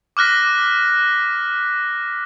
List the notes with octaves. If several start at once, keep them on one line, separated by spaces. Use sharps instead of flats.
D6 F6 F#6 A#6 B6